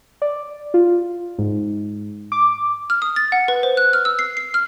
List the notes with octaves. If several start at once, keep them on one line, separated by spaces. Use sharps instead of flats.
D5
F4
G#2
D6
F6
D#6
A6
F#5
B4
C5
F#6
F6
E6
C7
C7
F6